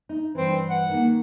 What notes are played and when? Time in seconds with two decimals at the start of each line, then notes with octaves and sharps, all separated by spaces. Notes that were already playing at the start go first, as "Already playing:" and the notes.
0.09 D#4
0.35 G2 E3 C4
0.69 F#5
0.89 D#3 A#3